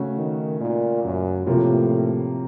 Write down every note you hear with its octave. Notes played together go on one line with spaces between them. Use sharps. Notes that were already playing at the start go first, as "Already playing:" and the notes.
Already playing: C#3 A3 C#4 F#4
D#3
A#2
F#2
A2 C3 F3 A#3 F4